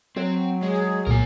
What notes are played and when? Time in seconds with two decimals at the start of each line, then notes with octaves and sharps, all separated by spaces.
0.16 F#3 C4
0.63 G#3 G#4
1.06 C2 A#2 A#3 A#4 G#5